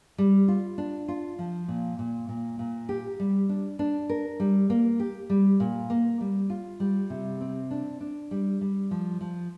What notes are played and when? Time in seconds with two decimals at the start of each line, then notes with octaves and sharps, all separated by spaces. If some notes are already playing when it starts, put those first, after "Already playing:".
0.18 G3
0.48 F4
0.78 D4
1.08 F4
1.39 F3
1.68 A#2
1.99 A#2
2.29 A#2
2.59 A#2
2.89 G4
3.20 G3
3.49 D4
3.79 D4
4.09 A#4
4.40 G3
4.70 A#3
5.00 G4
5.30 G3
5.60 A#2
5.90 A#3
6.21 G3
6.50 F4
6.80 G3
7.10 C3
7.41 C4
7.71 D4
8.00 D4
8.31 G3
8.61 G3
8.91 F3
9.21 F3